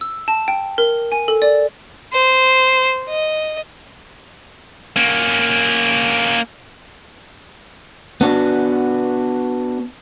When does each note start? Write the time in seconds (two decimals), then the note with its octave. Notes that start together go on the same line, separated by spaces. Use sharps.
0.01 E6
0.28 A5
0.48 G5
0.78 A#4
1.12 G#5
1.28 A4
1.42 D5
2.13 C5
3.09 D#5
4.96 A#3 C#4
8.21 B3 D4 F#4